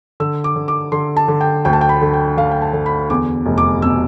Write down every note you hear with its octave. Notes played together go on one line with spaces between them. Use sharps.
D3 E6
D6
D3
D6
D3 C6
A5
D3
G5
D2 G5
A5
G5
B5
D3
G5
D3 F5
G5
A5
D3
B5
E2 D6
F1
D6
B2 E6